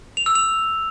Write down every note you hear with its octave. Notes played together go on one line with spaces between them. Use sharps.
F7
E6
F7